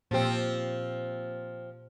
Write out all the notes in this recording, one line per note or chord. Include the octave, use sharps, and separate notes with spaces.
A#2 F3 C4 G4